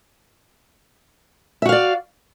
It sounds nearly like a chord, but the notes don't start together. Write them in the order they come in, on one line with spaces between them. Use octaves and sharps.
E5 F#4 F5 D5